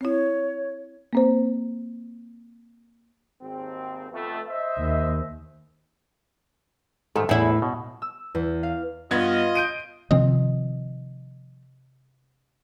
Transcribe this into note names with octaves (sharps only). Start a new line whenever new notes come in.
C4 E4 C#5
A#3 C4 C5
G#1 D#2 C4
F2 A3 B3
C5 D#5 E5
D#2
G#2 D#3 A3
E2 A2 E4
B2
E6
E2
F5
G2 B3 F4 D#5 G#6
G6 D7 D#7
C3 D#3 F3 C4 D#5